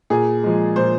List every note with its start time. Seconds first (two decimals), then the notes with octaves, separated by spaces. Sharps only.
0.10 A#2 G#4
0.44 F3 G#3
0.76 A#2 C5